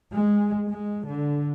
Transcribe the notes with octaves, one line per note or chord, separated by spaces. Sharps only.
G#3
G#3
D3